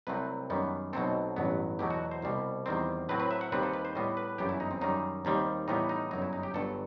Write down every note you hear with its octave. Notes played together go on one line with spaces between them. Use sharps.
C2 C3 F#3 A3 C4 B4
F#2 D#3 G3 B3
B1 B2 F#3 A3 C4 A4
A1 G2 F#3 B3
E2 B2 F#3 A3 G4
F#4
C5
C2 B2 G3 C4
E2 D#3 G3 C4
A2 F#3 C4 B4
B4
E5
F#5
D#2 D#3 G3 C4 B4
A4
B4
C5
A2 G3 B3 D#5
B4
G1 F#2 E3 B3 G4
E4
D#4
C4
F#2 D#3 G3 D#4
D#2 D#3 G3 C4
A2 E3 G3 B3 D#4
D#4
G1 F#2 F#3 D#4
E4
D#4
G4
G1 G2 F#3 A4